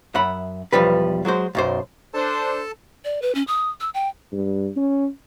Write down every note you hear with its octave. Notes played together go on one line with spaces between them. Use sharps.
F#2 E5 F#5 B5
B1 E2 F3 G3 B4
F#3 G#3 F#4 C5
B1 F#2 C5
D4 A4 C5 A5
D5
B4
C#4
D#6
E6
G5
G2
C#4